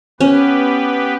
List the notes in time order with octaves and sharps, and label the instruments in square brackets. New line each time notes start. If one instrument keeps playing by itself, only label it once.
[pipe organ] B3 G4 B4 [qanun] C#4